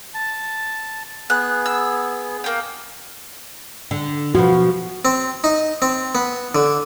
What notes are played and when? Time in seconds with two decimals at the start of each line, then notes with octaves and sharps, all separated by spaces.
0.14 A5
1.30 B3 G#4 F#6
1.66 E6
2.44 A#3 G5
3.91 D3
4.35 B2 F3 F#4
5.05 C4
5.44 D#4
5.82 C4
6.15 B3
6.55 D3